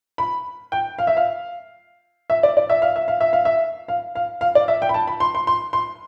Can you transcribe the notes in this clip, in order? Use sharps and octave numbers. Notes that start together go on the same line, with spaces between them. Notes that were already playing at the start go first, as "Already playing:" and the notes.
B5
G5
F5
E5
F5
E5
D5
D5
E5
F5
E5
F5
E5
F5
E5
F5
F5
F5
D5
E5
G5
B5
A5
B5
C6
C6
C6
C6